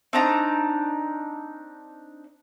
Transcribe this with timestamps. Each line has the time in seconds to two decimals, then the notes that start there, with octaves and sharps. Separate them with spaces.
0.13 C4 D4 D#4 A#5